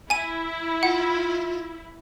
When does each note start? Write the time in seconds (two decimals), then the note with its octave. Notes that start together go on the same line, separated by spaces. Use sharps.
0.10 E4 G#5 D#7
0.83 F4 F#5